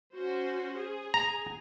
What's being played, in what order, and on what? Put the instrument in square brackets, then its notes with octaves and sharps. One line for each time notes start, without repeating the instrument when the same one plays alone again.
[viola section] C#4 F#4 C5
G#4
[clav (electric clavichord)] A#5